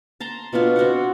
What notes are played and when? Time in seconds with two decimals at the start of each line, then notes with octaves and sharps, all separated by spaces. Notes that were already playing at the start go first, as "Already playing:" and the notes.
0.20 A5 A#5 C6
0.53 B2 B3 D4 F4
0.76 C4 F#4 C5 F#5